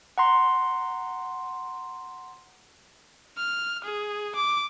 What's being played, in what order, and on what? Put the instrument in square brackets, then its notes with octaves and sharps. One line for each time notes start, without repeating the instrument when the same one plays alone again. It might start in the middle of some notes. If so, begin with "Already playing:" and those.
[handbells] F#5 A#5 C6
[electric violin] F6
G#4
D6